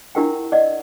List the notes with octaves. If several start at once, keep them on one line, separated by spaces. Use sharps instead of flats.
D4 E4 G4 A#4 F#5 G5
D5 D#5 F#5